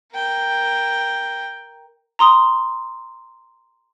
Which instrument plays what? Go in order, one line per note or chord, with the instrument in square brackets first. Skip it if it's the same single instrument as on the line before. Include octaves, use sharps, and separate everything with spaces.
[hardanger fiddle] A#4 G5
[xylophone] A#5 C6 D#6 G7